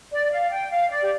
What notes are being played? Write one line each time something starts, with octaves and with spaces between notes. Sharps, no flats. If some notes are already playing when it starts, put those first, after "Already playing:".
D5
F5
G5
F5
D5
G4